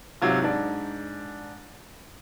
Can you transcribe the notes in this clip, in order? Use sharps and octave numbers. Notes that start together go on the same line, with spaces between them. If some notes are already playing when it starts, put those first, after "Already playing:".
G#2 C3 F#3 F4
G#2 D4